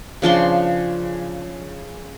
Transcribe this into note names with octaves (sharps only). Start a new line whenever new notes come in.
C#3 F3 D4 C6